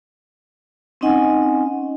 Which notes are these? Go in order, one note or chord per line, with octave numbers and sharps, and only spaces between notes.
C4 C#4 D#4 D#5 F#5 G#5